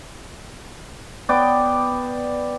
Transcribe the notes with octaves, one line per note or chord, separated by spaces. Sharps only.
B3 D5 G5 D6